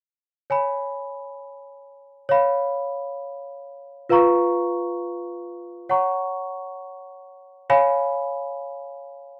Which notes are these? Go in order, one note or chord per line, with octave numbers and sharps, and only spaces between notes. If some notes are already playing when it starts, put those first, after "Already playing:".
C#5 G#5 B5
C#5 F5 B5
F4 B4 F5 A#5 C#6
C#5 F#5 A#5 C#6
C#5 F5 G#5 B5